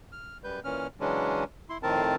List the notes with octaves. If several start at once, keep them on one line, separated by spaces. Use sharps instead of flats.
F6
F#2 G3 B4 G6
A#2 E3 C#4 F6
C#3 E3 F#3 G#3 C#4 D4
E4 C6
F2 A2 D#3 C4 A#4 A5